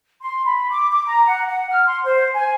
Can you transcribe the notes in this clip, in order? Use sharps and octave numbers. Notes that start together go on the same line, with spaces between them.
C6
B5
D6
D6
A#5
F#5
F#5
F6
C6
C5
G#5